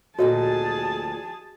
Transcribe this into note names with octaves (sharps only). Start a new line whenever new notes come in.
D2 A#2 F#4 G#4 A4 C#5 D#5 A5